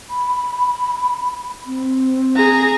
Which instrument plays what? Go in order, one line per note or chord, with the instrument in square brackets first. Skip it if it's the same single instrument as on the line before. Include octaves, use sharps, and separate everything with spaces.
[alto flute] B5
C4
[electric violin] G#4 A#5